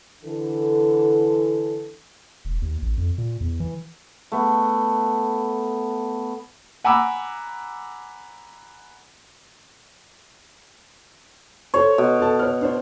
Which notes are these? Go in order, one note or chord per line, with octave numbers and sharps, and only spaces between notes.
D3 E3 A4
E1
D#2
A1
F2
A#2
E2
E3
A3 B3
F#5 G#5 A#5 B5 D6 E6
A4 C5 C#5
B2
A4 A5
C#5 F6
D4 C5 C#5